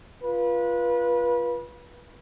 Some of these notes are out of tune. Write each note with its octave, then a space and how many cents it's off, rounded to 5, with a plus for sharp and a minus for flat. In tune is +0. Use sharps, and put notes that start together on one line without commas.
F4 -5 B4 -25